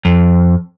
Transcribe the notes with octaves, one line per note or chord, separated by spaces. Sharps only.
F2